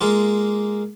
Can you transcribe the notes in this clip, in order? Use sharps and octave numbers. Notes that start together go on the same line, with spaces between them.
G#3 A#3 F4